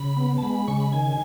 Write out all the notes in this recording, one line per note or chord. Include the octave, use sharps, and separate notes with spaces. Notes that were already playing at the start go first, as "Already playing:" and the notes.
Already playing: C#3 B5
B3
A5
G#3 B5
B5
C#3 C#6
B5
D#3 G#5